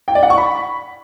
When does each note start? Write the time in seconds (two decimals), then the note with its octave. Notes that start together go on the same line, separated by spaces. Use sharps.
0.08 G5
0.15 D5
0.23 F#5
0.30 C#6
0.38 B5